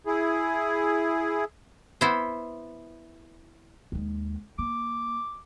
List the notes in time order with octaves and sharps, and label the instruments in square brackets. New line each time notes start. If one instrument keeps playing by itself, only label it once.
[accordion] E4 G#4
[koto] B3 E4 C5
[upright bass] D#2 G#3
[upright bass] A#3 [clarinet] D6